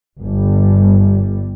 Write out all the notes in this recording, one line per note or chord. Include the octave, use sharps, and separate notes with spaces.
G1 G3